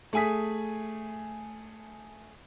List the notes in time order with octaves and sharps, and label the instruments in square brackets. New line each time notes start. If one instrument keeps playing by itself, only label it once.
[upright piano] A3 G#4 G#5 D#6 B6